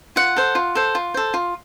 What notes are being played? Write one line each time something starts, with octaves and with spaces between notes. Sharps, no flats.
F4 F#5
A4 C5
F4
A4 C5
F4
A4 C5
F4